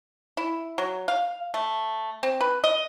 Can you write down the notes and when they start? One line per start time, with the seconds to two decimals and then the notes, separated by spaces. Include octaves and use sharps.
0.37 E4
0.78 F#3
1.08 F5
1.54 A3
2.23 C4
2.41 B4
2.64 D#5